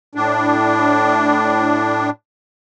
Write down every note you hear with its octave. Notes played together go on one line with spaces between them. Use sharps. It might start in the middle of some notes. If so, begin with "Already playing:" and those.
A2 D4